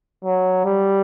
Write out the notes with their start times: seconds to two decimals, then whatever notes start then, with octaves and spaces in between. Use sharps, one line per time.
0.24 F#3
0.65 G3